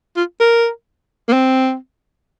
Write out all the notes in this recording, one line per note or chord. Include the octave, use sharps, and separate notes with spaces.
F4
A#4
A#3
C4